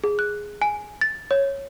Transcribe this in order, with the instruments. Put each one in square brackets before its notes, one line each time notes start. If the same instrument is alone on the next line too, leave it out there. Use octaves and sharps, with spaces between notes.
[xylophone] G#4
F#6
G#5
A6
C#5